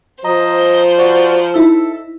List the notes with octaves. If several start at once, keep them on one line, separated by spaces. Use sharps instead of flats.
F3 C5 D#5 A#5
F#4 D5
D#4 E4 A4 E6